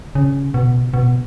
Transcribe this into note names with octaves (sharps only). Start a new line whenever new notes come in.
C#3
B2
B2